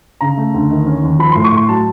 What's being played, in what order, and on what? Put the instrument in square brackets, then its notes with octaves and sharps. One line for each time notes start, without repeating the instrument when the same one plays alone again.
[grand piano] C#3 A#5
A3
D2
D#3
C#4
D#2
F3 B5
A2 C6
C#6
A2 C6
F#3 A5